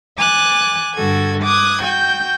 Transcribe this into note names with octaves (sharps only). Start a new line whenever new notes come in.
G#5 D6 F#6 A6
G2 D3 F#4 A4 G#6
D6 D#6 F#6 G#6
F#4 G5 G6